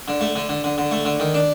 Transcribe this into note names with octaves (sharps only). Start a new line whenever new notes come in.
D3
A3
D3
D3
D3
D3
A3
D3
D#3
D4